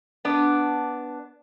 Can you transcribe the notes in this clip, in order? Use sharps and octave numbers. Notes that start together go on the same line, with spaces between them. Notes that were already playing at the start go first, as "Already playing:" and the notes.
B3 D4